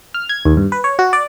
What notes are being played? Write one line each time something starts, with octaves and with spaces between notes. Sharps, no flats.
F6
G#6
D#2
G2
B4
C#5
F#4
D5